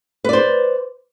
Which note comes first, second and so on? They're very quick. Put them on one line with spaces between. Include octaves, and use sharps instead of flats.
B4 D5 C5